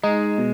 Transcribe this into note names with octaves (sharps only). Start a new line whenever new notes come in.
G#3 D#4
B2